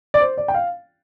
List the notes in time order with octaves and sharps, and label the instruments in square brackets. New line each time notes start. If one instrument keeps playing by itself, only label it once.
[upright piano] D5
C5
D5
G5
F5